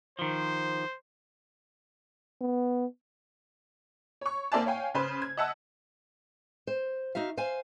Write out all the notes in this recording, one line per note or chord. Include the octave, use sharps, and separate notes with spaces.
D#3 F3 C5
B3
C#5 C#6
A#3 C4 D5 E5 G#5 A5
C#5 F5 G5 G#5
C#3 B4 C5
G#6
D#5 E5 F#5 A5 E6
C5
D#4 F#4 E5 F5
C5 F5 G#5